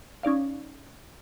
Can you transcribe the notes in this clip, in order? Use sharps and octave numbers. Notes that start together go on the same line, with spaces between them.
C#4 D#4 D5 F5